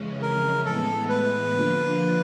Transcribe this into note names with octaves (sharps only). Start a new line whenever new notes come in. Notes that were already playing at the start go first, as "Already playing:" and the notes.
Already playing: F2 C#3 E3 G#3 C#4
A#4
A2 E3 G#3 B3 A4
B4
D3 F3 A#3 D4 F4